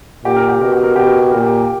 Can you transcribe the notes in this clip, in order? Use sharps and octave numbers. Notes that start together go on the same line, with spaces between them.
A#2 G4
A#4
G4
B2 A#4
G4
A#4
B2 G4
A#4
G4
A#2 A#4
G4